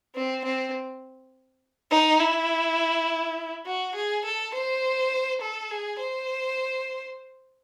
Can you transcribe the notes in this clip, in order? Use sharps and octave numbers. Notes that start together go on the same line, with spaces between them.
C4
C4
D#4
E4
F#4
G#4
A4
C5
A4
G#4
C5